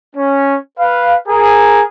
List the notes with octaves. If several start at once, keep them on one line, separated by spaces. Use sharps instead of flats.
C#4
B4 F5
G#4 A#4